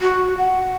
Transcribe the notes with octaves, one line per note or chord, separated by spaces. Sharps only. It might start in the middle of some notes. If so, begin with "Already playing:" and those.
F#4
F#5